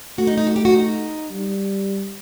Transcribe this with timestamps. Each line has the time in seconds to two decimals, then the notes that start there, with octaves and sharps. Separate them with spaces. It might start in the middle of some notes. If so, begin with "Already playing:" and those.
0.18 A3 F#4
0.27 D#4
0.37 D#4
0.47 F#4
0.56 G4
0.65 F#4
0.75 D#4
1.31 G3